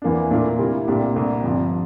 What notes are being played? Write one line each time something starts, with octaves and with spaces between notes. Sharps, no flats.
E2 E3 A#3 D4
A#2 A3 D4 F4 A#4
C3 G3 A#3 E4
C2 A#2 A3 D4 G4
C2 A#2 A3
G1 G2 F3 C4